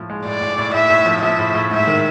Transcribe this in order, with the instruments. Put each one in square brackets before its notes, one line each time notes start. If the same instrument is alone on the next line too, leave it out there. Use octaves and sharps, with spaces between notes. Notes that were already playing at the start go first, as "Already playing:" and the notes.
Already playing: [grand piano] A2 F3
G#3
[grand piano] A2 [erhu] D5
[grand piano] A2
A2
[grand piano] A2 [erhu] E5
[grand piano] A2
F3
[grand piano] F3 [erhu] E5
[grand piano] A2
A2
[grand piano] G#2 [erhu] E5
[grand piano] D#3